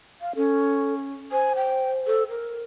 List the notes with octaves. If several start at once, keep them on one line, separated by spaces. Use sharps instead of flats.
F5
C#4 A4
C5 G#5
G5
A4
A#4